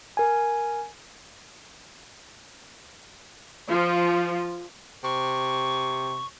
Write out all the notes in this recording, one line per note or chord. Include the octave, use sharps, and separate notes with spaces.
A#4 G#5
F3 F4
C3 C#6